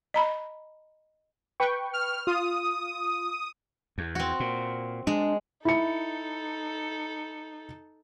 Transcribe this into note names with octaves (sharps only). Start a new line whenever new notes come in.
D#5 A#5 B5
B4 G5 C#6
F6
F4 D#6
E2
C4 F#4
A#2
G#3 D4
D#4 E4 A4 C#7